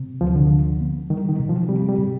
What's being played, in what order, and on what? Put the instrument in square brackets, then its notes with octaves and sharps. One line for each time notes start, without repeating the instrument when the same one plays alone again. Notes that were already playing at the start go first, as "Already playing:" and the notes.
Already playing: [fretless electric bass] C3
[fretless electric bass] D2 [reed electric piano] F3
[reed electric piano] D3
[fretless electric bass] F3
B3
[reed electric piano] D#3 [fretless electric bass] G3
[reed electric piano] D#3
[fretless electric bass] C3
[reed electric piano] F3
[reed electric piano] G3 [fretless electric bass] C4
[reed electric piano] G3
[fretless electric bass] C3